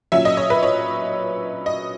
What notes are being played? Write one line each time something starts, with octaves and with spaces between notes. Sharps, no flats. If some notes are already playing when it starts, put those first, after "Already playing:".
A#2 F#3 C#4 E5
D#5
C#5
B4
C#5
D#5